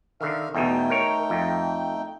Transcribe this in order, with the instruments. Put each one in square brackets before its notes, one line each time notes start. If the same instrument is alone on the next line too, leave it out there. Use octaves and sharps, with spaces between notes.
[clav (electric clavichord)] D3 D#3 [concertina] E5 F5 F6
[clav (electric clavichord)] E2 B2 [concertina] A3 D#4 G5
[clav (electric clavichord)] A#4 C#5
F2